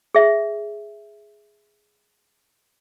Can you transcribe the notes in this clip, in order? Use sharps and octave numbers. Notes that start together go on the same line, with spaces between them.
G#4 E5